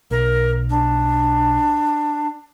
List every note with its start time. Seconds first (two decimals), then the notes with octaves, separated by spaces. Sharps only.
0.11 B1 A#4
0.70 D4